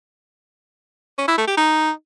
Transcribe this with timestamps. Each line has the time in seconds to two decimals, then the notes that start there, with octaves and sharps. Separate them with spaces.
1.18 C#4
1.28 E4
1.38 A3
1.47 G4
1.57 D#4